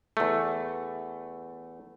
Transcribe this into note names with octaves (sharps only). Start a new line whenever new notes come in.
E2 A3